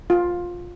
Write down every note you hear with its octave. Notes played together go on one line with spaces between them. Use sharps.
F4